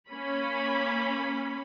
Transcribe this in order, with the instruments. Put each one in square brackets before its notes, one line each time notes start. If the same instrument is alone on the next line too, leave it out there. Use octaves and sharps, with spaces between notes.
[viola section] A#3 C#4 B5